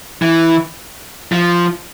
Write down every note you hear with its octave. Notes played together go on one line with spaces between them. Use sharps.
E3
F3